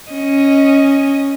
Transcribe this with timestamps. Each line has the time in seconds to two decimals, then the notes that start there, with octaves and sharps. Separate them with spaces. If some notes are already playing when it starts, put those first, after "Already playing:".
0.12 C#4 D#5